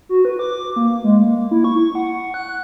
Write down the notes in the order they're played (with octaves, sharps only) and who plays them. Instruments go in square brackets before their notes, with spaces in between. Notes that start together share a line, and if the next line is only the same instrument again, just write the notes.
[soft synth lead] F#4
B4
D6
A#3
G#3
A#3
E4
C#6
F#5
F#6